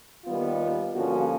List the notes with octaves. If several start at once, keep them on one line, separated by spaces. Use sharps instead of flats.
D#2 D#3 G3 B3 F4
G2 D3 F3 A#3 C#4 F#4